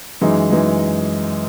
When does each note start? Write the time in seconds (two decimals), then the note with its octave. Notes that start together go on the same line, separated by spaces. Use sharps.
0.21 F#2 E3 G#3 D#4
0.51 F#2 E3 G#3 D#4